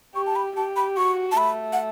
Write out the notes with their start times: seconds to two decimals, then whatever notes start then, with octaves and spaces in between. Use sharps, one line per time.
0.15 G4 C#6
0.26 A5
0.36 B5
0.57 G4 A5
0.76 B5
0.97 F#4 C#6
1.32 A5
1.37 A3 B5
1.73 F#5